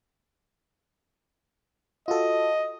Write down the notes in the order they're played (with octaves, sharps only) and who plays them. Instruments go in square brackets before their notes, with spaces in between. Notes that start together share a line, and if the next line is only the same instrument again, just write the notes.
[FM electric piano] F4 F#4 A4 [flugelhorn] D#5